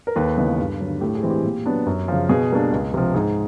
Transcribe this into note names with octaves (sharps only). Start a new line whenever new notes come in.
A#4
D#2 A4 B4
C#3 E3 G#3 B3
G2
D3 F#3
A2 G4 A4
G#4
E3 G#3 C4
G4
A#2
F#3 B3 D4
F#2
C#3 F3
B2 G#4
G3 A#3 D4
C#2
C3 F3
G#2 G#4